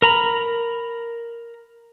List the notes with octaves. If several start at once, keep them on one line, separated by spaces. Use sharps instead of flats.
A#4 A#5 B5